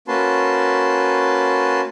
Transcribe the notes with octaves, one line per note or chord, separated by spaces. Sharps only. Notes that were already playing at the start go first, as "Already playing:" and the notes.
A#3 C#4 F#4 B4 A5 C6